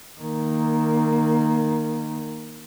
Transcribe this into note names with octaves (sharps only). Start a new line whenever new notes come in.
D#3 A#3